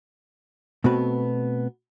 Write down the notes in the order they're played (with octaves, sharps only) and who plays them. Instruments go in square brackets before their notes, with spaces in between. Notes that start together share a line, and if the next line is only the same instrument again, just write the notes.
[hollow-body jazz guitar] B2 A3 B3 C4 F#4 B4